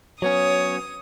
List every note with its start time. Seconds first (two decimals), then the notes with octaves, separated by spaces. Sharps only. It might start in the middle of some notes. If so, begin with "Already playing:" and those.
0.22 F#3 B3 C#4 C#5 D#6